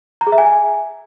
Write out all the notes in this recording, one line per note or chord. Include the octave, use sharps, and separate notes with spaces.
A#5
G#4
E5
G#5